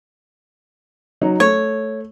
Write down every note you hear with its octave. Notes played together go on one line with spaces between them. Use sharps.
F#3 D#4
A3 C#5